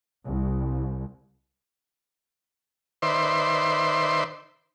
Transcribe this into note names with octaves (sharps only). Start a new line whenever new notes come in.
C2
D#3 B4 C5 D5 E5 C6